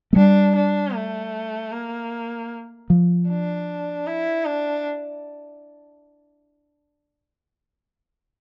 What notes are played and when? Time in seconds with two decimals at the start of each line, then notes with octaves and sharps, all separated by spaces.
0.13 A3
0.16 G3 D4
0.55 D4
0.95 A3
1.72 A#3
2.90 F3
3.29 D4
4.07 E4
4.45 D4